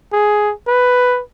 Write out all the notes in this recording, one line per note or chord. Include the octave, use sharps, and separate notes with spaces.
G#4
B4